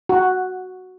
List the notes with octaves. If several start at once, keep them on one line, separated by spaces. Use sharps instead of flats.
F#4